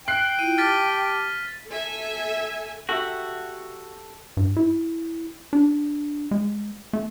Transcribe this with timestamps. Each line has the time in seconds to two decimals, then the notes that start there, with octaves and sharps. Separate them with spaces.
0.08 G5 F#6 C7
0.39 E4 F4 D#7
0.58 G4 A5 D6 F6 A6 B6
1.70 A4 E5 G#5
2.89 F#4 G4 A4 E5
4.37 G2
4.57 E4
5.53 D4
6.31 G#3
6.93 A3